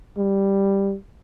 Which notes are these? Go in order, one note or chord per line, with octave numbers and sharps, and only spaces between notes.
G3